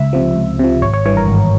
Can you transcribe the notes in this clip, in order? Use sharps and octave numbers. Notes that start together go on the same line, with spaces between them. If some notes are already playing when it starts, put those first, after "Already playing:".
Already playing: C#2 E5
C3 F3
C#2
C3 F3
G#1 C#5
C#5
G2 E3 C#5
A#4
G#1